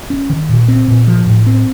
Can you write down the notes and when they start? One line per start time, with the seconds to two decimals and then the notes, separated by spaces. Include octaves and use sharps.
0.10 C#4
0.30 D#3
0.49 A#2
0.68 C4
0.88 A#2
1.07 F3
1.27 A2
1.46 C4